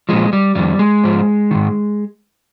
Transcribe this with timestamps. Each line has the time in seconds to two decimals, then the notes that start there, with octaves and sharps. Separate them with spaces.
0.09 A#2 F3 G#3
0.33 G3
0.55 F2 D#3 G3
0.79 G#3
1.04 G#2 F3
1.51 G#2 D#3